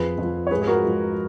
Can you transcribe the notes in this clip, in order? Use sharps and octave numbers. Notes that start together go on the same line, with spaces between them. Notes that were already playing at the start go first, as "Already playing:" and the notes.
Already playing: F2 F3 G#4 B4
F2 F3
C#5
G#2 F3 G#4 B4
G#4
F#4 A#4
G#2 F3